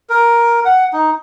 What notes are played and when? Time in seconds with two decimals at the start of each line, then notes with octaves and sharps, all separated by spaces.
0.09 A#4
0.65 F#5
0.93 D#4